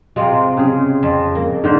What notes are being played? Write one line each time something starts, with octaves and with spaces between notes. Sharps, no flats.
C3 G#3 C4 F4
C#3 G#4
F2
A#3
G#2 D3 C5